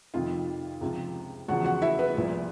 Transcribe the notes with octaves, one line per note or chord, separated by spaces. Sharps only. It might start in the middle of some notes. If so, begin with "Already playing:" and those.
F2 C3 D#3 F4 F5
C#2 C3 F3
E2 C#3 F3 F#4 F#5
F#4 F#5
E4 E5
B3 B4
C2 A#2 F3